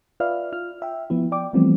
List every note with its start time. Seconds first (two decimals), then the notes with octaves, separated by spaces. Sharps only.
0.20 F4 B4 D5 E5 F5 F6
0.52 F4 F6
0.82 E5 G5
1.10 F3 B3 E4
1.32 D5 G5 D6
1.53 E3 F3 G3 A3 B3 C4